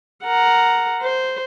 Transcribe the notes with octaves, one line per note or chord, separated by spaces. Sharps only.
A#4 F#5
C5